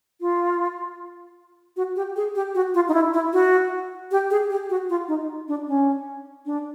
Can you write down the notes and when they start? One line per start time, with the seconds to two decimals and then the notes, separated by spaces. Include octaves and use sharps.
0.21 F4
1.77 F#4
1.96 G4
2.16 G#4
2.35 G4
2.55 F#4
2.74 F4
2.88 D#4
2.94 E4
3.13 E4
3.33 F#4
4.11 G4
4.31 G#4
4.50 G4
4.70 F#4
4.89 F4
5.08 D#4
5.48 D4
5.68 C#4
6.46 D4